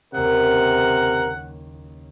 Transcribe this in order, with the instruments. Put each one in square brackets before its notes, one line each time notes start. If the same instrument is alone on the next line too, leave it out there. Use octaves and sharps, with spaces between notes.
[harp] F#1 D#2 [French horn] C3 [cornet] A#4 [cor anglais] F#5